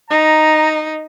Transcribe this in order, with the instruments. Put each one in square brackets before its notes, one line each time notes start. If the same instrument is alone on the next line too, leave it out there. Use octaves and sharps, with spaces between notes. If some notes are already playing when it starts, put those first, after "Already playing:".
[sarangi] D#4 [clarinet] A#5